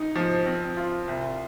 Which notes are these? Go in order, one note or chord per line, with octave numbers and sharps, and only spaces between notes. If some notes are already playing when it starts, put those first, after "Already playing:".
Already playing: D#4
F3
C4
F4
C2